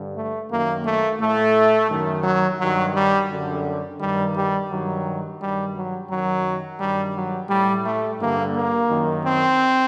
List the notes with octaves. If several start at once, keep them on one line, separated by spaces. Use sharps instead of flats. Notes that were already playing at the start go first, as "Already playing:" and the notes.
Already playing: G2 D3
A3
F#2 D#3 A#3
A3
A2 A3
F#2 D#3
F#3
G2 D#3 F#3
G3
F#2 D3
G2 D#3 G3
G3
G2 D#3 F#3
G2 D#3 G3
F#3
F#2 D#3 F#3
G2 D#3 G3
F#3
A2 G3
A3
G2 D3 A#3
A#3
F#2 D#3
C4